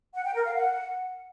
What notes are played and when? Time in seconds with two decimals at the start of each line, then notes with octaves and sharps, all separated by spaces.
0.14 F#5
0.24 G5
0.34 A#4
0.45 F5
0.55 F#5